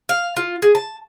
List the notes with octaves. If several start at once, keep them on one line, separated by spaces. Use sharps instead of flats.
F5
F4
G#4
A5